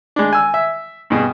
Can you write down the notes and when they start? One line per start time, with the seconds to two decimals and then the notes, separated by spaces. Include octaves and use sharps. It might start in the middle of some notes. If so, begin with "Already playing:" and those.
0.16 G#3 D4
0.33 G#5 E6
0.54 E5
1.10 G2 B2 G#4